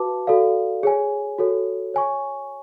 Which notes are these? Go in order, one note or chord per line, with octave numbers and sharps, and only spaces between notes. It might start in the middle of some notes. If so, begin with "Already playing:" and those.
Already playing: F#4 B4 F5 A5 D6
F#4 A4 D5 F5
G#4 C#5 G#5
F#4 A4 C#5
C#5 G#5 C#6